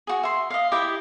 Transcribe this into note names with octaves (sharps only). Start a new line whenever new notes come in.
F#4 G#4
E5 C6
D#5 F5
E4 G4 D#5 E5